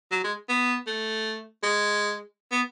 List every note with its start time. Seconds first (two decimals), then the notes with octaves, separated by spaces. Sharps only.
0.11 F#3
0.24 G#3
0.49 B3
0.87 A3
1.63 G#3
2.52 B3